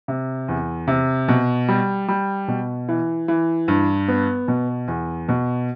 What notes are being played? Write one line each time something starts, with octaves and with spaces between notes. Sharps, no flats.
C3
E2
C3
B2
G3
G3
B2
E3
E3
G2
B3
B2
E2
B2